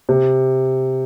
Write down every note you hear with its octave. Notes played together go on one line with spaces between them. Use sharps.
C3